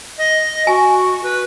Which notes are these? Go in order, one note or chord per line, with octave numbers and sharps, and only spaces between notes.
D#5
F#4 G#5
B4